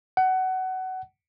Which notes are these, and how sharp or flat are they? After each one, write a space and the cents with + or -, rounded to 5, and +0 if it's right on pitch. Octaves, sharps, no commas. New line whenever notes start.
F#5 +20